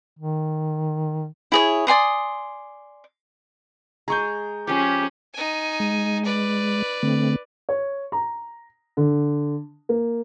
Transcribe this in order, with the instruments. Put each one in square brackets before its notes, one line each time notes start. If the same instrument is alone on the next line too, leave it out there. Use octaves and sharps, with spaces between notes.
[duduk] D#3
[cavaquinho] E4 G#4 C#5
D5 G#5 C6 D#6
[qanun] G#3 G#4 [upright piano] A#5 C#6 G6
[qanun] F3 F4 [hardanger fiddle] C#4 G#4 [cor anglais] G4
[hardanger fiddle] D#4 G#5
[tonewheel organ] G#3
[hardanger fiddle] B4 D5
[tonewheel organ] D3 A3 C4
[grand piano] C#5
A#5
D3
A#3